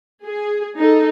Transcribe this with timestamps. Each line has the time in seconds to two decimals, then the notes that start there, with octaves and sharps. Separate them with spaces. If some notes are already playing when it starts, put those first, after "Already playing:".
0.25 G#4
0.78 D#4 A4